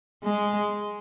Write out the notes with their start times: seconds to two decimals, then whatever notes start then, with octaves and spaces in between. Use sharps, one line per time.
0.24 G#3